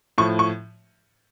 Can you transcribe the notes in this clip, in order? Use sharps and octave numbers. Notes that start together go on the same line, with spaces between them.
A2 F3 C#6
C#6